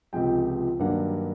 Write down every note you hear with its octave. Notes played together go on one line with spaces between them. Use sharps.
C#2 C3 F3 G#3 G5
G2 D#3 F#3 A#3 D4 F#5